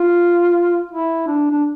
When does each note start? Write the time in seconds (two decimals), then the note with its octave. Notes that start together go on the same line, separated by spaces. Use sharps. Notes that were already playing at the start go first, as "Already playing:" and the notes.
Already playing: F4
0.91 E4
1.27 D4
1.51 D4